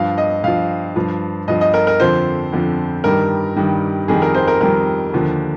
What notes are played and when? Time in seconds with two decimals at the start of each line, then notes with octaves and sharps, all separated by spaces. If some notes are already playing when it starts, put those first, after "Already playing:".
Already playing: G2 F3 F5
0.18 D#5
0.43 G2 F3 F5
0.96 G2 F3
1.48 G2 F3 D#5
1.61 D#5
1.74 A#4
1.87 A#4
2.00 F2 D3 F3 C5
2.52 F2 D3 F3
3.04 G2 D#3 G3 A#4
3.56 G2 D#3 G3
4.08 F2 D#3 G3 G#4
4.22 A#4
4.34 C5
4.47 A#4
4.61 F2 D#3 G3 A#4
5.13 D#2 D3 F3